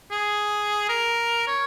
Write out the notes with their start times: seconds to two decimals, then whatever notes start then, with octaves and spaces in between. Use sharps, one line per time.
0.11 G#4
0.89 A#4
1.47 C#5